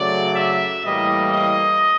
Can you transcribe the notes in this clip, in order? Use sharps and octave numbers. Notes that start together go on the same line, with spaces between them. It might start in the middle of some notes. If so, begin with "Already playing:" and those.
Already playing: C#3 F#3 A3 D5
E5
A2 E3 G3 A#3 D#5
D#5